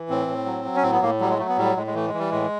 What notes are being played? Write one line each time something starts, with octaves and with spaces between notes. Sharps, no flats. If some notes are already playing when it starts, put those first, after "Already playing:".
Already playing: E3
A2 C4
A2
F#3
F#3
C#4
A2 C4
B3
A2 A#3
F#3 G3
G#3
F#3 A3
B3
A2 G3
A2 G#3
G#3
E3 A3
G#3
E3
G3
A2 G#3